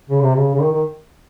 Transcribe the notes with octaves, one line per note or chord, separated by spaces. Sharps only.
C#3
C3
C#3
C#3
D#3
D#3